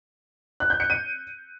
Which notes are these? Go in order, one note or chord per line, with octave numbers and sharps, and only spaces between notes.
F#6
G6
C#7
D#7